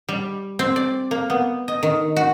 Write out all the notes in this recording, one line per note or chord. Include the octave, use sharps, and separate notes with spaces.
G3
C4
D5
A#3
B3
D#5
D#3
F#4